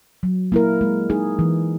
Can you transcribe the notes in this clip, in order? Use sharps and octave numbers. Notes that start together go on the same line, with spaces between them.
F#3
A#3 E4 A#4
G#3
D#4 G#4
E3